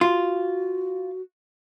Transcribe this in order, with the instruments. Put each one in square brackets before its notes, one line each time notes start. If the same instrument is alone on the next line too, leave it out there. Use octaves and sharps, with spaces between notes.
[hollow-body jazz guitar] F4 [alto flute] F#4